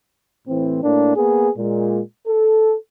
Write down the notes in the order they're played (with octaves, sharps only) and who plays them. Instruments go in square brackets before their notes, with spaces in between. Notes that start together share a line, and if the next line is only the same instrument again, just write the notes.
[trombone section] A2 E3 C4
A2 A#3 D4
A#3 B3 G#4
A#2 G#3
A4